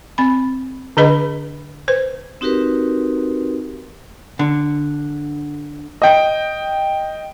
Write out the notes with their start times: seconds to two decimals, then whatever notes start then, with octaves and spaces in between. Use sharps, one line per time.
0.18 C4 B5
0.97 D3 D4 G#4 B4 D#5 B5
1.88 B4 C5
2.41 C4 D#4 F#4 G4 A#4 B4
4.39 D3
6.02 D#5 G5